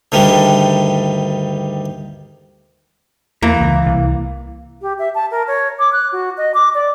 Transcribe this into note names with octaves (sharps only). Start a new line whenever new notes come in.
D2 G2 D#3 G3
E2 E3 A#3
C#2
C2
G4
E5
A5
A#4
C#5
D6
F#6
F#4
D#5
D6
D5